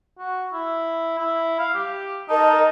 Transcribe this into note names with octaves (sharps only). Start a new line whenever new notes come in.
F#4
E4
E4
F5
G4
D#4 A#4 D#5 A5